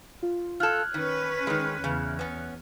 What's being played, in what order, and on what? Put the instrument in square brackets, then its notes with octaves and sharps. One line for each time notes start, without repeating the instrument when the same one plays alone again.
[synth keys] F4
[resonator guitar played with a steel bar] F4 A4 [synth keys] F6 F#6 G#6
[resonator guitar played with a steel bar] D#3 [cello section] C#4 B4
[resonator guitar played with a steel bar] D#3 G#3
[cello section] E2 [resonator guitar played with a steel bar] C#3
[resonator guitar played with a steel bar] B3 C#4